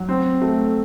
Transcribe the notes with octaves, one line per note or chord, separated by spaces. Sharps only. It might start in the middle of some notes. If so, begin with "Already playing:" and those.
Already playing: F#3
C4
A3